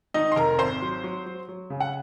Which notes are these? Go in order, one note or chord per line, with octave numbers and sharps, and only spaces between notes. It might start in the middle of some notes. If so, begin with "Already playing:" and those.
D#3 D#4 D#5
C6
F1 A#4 A#5
G#1 C5 C6
F#3
F#3
F#3
F#3
C#3
F#5